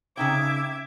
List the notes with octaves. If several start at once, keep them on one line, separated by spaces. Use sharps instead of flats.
C#3 D#4 E5 G5 D6 G#6